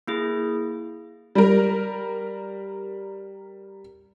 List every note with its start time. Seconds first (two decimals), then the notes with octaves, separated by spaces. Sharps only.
0.08 A#3 E4 G#4
1.35 G3 A#4